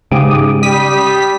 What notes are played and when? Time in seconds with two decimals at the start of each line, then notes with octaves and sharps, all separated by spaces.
0.12 G#2 C#3 G4 D6 D#6
0.63 G3 D#6 B6